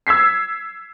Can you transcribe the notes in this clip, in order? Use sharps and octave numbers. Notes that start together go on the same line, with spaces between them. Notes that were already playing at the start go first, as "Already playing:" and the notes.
E6 G#6 B6 C7